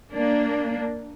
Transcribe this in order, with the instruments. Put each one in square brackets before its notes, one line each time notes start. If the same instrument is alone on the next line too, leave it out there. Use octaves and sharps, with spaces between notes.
[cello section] A#3 D4